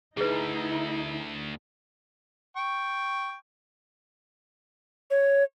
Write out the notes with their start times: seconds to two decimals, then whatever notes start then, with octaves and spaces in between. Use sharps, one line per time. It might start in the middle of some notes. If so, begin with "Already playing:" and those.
0.17 D2 D#4 E4 G#4 B4
2.56 G5 C#6
5.11 C#5